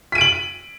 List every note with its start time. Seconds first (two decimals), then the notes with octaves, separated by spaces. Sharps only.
0.12 B6
0.15 D#7
0.18 D7
0.21 F#7